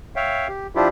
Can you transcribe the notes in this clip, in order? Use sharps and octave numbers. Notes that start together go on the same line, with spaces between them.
C#5 E5 F5 G5
G4
F3 D4 E4 F4 G4